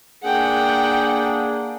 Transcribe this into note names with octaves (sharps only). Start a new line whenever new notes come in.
A#3 D4 G#4 F#5 G5